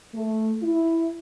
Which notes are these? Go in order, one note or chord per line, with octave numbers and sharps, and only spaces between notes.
A3
E4